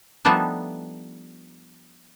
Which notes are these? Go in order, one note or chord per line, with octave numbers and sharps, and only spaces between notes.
F3 G3 A3 B3 D4 D#4